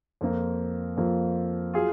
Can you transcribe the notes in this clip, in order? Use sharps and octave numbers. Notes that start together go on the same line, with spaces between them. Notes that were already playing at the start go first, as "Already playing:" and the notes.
F2 F3 A#3
F2 F3 A#3
F#3 F4 G#4